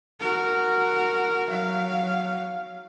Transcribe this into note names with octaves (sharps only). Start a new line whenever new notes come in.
F#4 A#4
F#3 F5